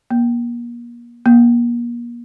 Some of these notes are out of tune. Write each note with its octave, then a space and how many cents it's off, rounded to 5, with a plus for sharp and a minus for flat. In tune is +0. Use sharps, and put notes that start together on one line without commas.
A#3 +35
A#3 +35